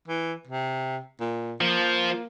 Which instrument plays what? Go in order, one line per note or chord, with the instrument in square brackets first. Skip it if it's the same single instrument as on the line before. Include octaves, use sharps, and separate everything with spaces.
[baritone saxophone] E3
C3
A#2
[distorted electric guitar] F3 [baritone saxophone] A#3